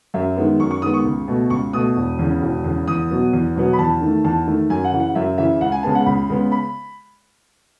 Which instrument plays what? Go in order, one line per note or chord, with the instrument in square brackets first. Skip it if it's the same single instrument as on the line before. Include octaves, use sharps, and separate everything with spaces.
[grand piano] F#2 E5
D#3 G#3 B3
F#2 C#6
C#6
D#3 G#3 B3 D#6
C#6
C#2
B2 A3
C#2 C#6
B2 A3 D#6
E1
E2 C#3
E1
E2 C#3
E2 D#6
B2 F#3 B3
E2
B2 F#3 B3
B5
E2 A5
D#3 A3
E2 A5
D#3 A3
F#2 G#5
F#5
C#3 E3
F#5
F#2 E5
C#3 E3 E5
C#2 F#5
G#5
C#3 G#3 B3 A5
F#5
C#2 B5
C#3 G#3 B3
B5